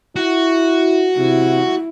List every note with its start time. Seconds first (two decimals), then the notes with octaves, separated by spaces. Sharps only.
0.16 E4 F#4
1.18 C3 E4